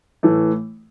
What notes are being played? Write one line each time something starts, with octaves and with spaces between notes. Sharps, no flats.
A2 E3 A3